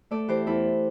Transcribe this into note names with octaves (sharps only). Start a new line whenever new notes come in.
A3 A4 D5
E3 G4 C5
E2 E4 A4